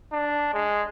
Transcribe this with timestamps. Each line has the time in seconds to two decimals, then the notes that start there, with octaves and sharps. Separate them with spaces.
0.12 D4
0.54 G#3